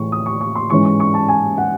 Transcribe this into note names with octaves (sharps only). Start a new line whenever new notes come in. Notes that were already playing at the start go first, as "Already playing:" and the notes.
Already playing: A2 E3 G#3 C#6
D#6
C#6
C#6
C6
G#2 E3 G#3 C#4 C#6
C#6
C#6
A5
G#5
F#5